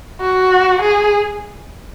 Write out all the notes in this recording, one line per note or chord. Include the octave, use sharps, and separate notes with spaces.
F#4
G#4